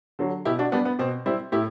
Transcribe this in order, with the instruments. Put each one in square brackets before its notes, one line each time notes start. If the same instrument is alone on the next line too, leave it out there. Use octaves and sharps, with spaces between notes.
[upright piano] D3 F#3
B2 E4 G4
D4 F#4
G3 B3 D4
B3
B2 C4
G3 C4 E4
A2 E4 G4